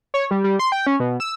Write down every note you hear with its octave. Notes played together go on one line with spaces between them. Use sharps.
C#5
G3
G3
C6
G5
C#4
B2
E6